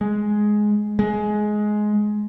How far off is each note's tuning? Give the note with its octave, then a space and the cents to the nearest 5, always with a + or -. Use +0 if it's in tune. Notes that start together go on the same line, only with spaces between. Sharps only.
G#3 +10
G#3 +15